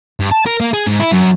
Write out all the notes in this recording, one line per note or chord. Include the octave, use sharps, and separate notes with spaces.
G2
A5
A#4
A#3
G#4
G#2
E4
F#2